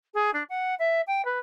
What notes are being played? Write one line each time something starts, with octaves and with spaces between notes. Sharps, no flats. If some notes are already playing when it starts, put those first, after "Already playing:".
G#4
D4
F#5
E5
G5
B4